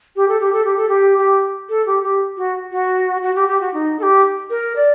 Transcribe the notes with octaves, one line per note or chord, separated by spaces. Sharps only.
G4
A4
G4
A4
G4
A4
G4
G4
A4
G4
G4
F#4
F#4
F#4
G4
G4
F#4
D#4
A4
G4
A#4
D5